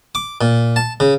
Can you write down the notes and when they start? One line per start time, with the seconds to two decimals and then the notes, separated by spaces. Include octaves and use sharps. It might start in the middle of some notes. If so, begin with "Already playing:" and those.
0.15 D6
0.41 A#2
0.76 A5
1.00 C#3